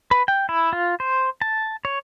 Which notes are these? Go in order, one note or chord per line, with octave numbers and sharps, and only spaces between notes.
B4
G5
E4
F4
C5
A5
C#5